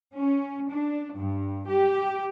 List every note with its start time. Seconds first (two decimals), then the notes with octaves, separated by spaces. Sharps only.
0.16 C#4
0.71 D4
1.16 G2
1.67 G4